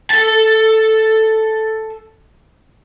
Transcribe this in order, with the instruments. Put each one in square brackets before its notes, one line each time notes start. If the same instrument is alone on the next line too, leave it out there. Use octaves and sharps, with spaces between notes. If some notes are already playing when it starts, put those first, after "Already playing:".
[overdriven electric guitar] A4 A5